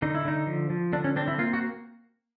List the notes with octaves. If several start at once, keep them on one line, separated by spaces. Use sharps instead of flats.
D3 D#4
E4
D3 D#4
F3
F3
D3 D4
C#4
C4 D4
E4
A#3 F4
F#4